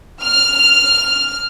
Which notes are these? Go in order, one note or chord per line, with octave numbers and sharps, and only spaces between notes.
F6